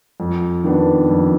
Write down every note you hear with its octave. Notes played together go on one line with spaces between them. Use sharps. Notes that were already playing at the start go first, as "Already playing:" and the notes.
F2
D#3 B3 D4
F2